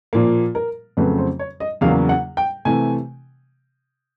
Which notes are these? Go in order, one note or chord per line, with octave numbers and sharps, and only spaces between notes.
A#2 F3 A#3
A#4
F2 C#3 F#3 A3 C4 B4
C5
C#5
D#5
E2 C#3 F#3 A#3 F5
F#5
G5
C3 E3 A3 G#5